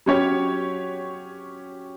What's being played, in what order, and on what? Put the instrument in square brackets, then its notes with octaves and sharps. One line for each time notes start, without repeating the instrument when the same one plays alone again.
[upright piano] F#3 C#4 G4 C#5